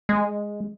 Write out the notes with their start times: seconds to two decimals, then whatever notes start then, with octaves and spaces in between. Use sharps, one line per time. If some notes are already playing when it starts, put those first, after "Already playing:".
0.09 G#3